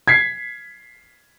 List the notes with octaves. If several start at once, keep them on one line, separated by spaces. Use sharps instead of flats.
G#6 B6 C7